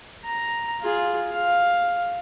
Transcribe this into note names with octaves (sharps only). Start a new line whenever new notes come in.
A#5
F4 G#4
F5